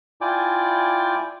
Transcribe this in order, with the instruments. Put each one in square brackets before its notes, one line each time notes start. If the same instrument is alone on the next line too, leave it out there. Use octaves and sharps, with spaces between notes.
[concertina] E4 F4 D5 G5 G#5 D6